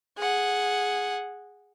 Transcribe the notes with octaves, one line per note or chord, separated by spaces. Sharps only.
G#4 F#5